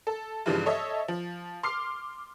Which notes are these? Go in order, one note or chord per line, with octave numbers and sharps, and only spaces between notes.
A4
G2 C#3 E3 F3 G3 G#3
A4 C#5 D#5 E5
F3
C6 D6 F6 C7